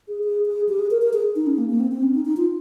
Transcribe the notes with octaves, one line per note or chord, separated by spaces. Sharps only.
G#4
G#4
G#4
G4
G#4
A#4
A#4
G#4
D#4
C#4
A#3
A#3
C4
C4
C#4
D#4
D#4
F4